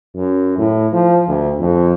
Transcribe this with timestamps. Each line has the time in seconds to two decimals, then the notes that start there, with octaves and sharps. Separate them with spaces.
0.15 F#2
0.58 A2
0.92 F3
1.28 D2
1.60 F2